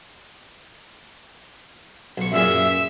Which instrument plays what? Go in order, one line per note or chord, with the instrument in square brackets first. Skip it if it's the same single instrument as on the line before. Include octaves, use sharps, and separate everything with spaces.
[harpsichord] B1 C#6
[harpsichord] F#2 A#2 G#4 [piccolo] E5